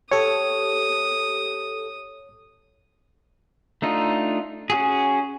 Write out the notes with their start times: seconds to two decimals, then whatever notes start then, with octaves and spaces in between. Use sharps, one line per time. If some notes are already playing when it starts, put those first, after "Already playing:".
0.12 G4 A4 C#5 D#6
3.82 A3 D4 D#4 F4
4.70 C#4 F#4 G#4